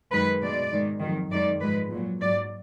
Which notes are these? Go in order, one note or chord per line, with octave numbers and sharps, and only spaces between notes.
F#2 D#3 G#3 B4
B2 G#3 D5
G#2 D#3 G#3
F2 D#3 F#3
F#2 D#3 G#3 D5
G#2 F3 G#3 B4
A#2
F#3
G#2 F#3 D5